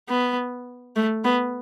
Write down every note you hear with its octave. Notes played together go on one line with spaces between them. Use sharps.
B3
A3
B3